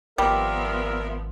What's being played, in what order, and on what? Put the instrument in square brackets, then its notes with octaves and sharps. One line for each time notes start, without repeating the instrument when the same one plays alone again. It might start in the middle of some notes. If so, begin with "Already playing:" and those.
[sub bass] G#1 [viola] F3 B3 [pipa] G3 [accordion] A#4 E5